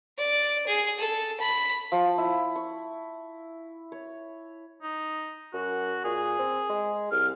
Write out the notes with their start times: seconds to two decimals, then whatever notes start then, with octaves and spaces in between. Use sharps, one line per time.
0.18 D5
0.67 G#4
0.99 A4
1.40 B5
1.92 F3
2.18 E4
2.56 C#6
3.92 C#5
4.82 D#4
5.54 F#2 F#4
6.04 A#2 G#4
6.39 C4
6.69 G#3
7.12 C2 F6